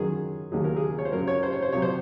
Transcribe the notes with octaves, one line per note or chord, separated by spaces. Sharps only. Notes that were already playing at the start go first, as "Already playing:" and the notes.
Already playing: F#2 D#3 F#3 G#4
D#2 D#3 F#3 G#4
A#4
G#4
C#5
C5
F#2 C#3 F#3 A#4
C#5
C5
C#5
C5
C2 C3 F#3 C#5
C5